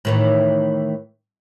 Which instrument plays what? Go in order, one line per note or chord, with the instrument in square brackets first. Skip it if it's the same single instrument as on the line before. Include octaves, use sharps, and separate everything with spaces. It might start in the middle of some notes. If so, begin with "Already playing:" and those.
[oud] A2 D#3 E3